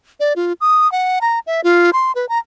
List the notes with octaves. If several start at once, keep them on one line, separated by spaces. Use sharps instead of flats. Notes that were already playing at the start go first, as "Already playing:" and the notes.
D5
F4
D#6
F#5
A#5
E5
F4
C6
B4
A#5